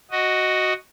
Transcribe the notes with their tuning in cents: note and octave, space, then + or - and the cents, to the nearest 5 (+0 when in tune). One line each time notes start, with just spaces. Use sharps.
F#4 +0 D#5 +0